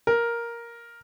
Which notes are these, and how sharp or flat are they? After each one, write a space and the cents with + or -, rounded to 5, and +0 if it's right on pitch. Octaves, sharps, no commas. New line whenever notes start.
A#4 +5